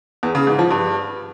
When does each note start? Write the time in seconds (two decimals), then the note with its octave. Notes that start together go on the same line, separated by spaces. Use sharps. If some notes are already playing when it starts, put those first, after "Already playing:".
0.23 E2
0.35 C#3
0.47 G#2
0.59 F3
0.71 G2